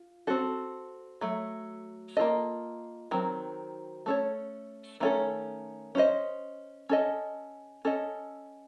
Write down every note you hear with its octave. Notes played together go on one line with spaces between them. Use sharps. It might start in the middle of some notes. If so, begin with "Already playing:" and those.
Already playing: F4
C4 F#4 A4
F#3 A3
A#3 F4 A4 D#5
D#3 F#3 C4
A3 C#4 A4 C#5
D#3 A3 C#4 F4 A4
C#4 F#4 C5 D#5
C#4 A4 D#5
C#4 A4 D#5